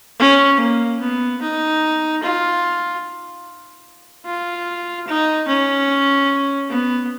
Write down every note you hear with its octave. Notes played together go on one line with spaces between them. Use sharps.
C#4
A#3
B3
D#4
F4
F4
D#4
C#4
B3